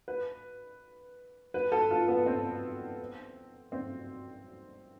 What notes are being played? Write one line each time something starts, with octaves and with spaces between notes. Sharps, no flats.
B4
B4
A4
F4
B3
C4
C4